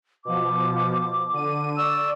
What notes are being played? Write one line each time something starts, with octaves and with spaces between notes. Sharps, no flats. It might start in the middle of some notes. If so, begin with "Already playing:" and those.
B2 F3 D6
D3 D#7
D5 C#6 E6